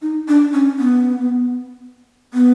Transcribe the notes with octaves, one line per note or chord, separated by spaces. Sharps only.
D#4
D4
C#4
B3
B3